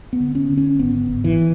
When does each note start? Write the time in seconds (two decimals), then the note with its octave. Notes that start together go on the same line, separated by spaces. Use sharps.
0.13 B3
0.20 D3
0.35 C#4
0.50 D3
0.57 C#4
0.79 G#1 B3
1.09 G#1
1.24 E3